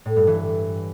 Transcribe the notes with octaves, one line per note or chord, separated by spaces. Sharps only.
A2
G2
E3